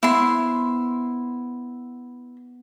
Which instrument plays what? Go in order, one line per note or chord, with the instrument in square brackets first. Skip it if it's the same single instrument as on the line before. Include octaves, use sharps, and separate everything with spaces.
[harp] B3 C5 E6 [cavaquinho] E4 C6